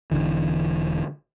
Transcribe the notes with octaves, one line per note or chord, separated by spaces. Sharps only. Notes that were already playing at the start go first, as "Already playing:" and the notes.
E1 C2 D3 E3